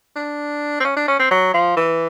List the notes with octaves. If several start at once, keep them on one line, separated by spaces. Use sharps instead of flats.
D4
C4
C#4
D4
C#4
C4
F#3
F3
E3